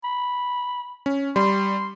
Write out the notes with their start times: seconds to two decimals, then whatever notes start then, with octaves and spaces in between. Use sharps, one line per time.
0.04 B5
1.06 C#4
1.36 G3 C6